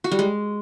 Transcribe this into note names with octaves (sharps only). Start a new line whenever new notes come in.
F#4
G3
G#3